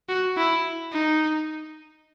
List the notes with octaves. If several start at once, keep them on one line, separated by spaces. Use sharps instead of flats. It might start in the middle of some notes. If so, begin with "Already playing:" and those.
F#4
E4
D#4